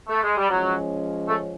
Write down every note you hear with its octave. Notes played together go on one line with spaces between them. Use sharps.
A3
G#3
G3
F3 F#3 G#3 C#4
A3